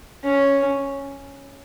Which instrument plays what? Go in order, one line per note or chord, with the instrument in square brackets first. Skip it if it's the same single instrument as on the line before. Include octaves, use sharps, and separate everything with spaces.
[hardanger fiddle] C#4